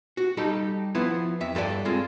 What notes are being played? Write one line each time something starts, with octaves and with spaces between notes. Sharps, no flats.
F#4
G3 D#4 G4 A4
F3 B3 E4
F2 E5
G2 A4 B4 D5
G#3 C4 F4 A4